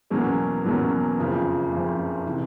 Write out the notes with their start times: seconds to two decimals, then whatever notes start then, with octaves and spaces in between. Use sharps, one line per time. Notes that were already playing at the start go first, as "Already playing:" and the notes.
0.10 E2 B2 F#3 A#3 C#4
0.64 E2 B2 F#3 A#3 C#4
1.19 F#1 F2 C#3 F3
1.71 F#1 F2 C#3 F3
2.26 C3 E3